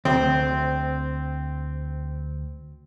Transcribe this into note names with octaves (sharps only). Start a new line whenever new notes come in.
D2 C4